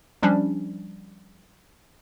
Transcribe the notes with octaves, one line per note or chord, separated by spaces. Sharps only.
F3 G3 C#4 D4